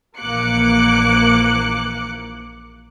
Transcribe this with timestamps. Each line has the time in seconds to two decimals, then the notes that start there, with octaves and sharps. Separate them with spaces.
0.19 A#1 E3 A#3 D6 F#6 C#7